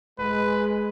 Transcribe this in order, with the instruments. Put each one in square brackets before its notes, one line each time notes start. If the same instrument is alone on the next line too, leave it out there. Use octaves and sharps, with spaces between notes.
[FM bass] D#1 [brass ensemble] G#3 [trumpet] B4